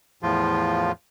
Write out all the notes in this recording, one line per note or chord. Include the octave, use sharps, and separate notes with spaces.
E2 A2 F3 F4